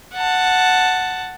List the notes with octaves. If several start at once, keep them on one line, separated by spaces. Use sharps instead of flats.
F#5 A5